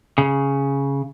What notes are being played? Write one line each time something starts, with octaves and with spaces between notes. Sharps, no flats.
C#3